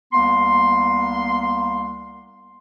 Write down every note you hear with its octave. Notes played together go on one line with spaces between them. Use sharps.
C2 A#3 B3 C6